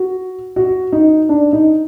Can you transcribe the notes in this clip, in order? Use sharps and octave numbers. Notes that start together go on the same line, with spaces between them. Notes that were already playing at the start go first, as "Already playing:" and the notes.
Already playing: F#4
F#4
D#4
D4
D#4